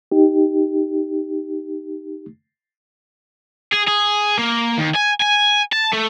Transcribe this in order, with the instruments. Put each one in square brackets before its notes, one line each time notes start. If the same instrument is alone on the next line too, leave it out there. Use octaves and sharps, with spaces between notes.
[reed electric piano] D#4 G4
[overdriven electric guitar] G#4
G#4
A#3
D#2
G#5
G#5
A5
A3